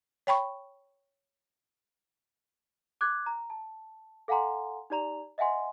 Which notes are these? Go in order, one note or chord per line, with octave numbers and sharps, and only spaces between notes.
C#5 G5 B5 C#6
D6 F#6 G#6
A#5
A5
A4 F5 F#5 G#5 A#5 C6
D#4 G4 D5 A#5 F7
D#5 E5 F#5 G#5 C6